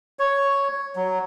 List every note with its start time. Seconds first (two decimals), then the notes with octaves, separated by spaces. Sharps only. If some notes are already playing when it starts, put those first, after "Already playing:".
0.19 C#5
0.96 F#3